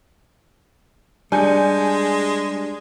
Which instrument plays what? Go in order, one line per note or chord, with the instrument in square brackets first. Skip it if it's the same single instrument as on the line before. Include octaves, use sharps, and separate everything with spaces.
[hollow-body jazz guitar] G3 [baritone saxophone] G#3 [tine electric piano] D4 [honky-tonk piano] G#5 G6 C#7